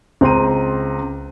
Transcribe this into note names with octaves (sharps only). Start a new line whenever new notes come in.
C#2 C4 A#5 C6 D#7